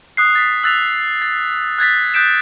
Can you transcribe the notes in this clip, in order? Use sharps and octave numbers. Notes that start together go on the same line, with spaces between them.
D#6 F#6 C7
A6 B6
E6 F#6 A6 B6 F7
A6
F#6 G#6 A6 B6
D#6 F#6 G6 B6 D7 E7